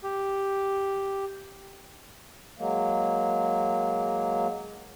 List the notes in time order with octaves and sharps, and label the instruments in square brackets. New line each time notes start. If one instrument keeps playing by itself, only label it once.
[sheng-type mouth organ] G4
[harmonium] F#3 G#3 A#3